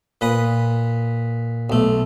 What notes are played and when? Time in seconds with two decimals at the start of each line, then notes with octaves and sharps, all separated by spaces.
0.21 A#2 B4 B5 D#6
1.70 B1 A3